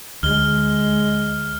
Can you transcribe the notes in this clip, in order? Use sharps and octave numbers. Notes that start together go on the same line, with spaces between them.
D2 G#3 F6 G7